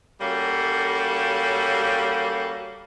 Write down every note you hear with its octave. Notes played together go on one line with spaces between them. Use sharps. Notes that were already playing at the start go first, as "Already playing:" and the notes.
G3 A#3 C#4 F#4 A4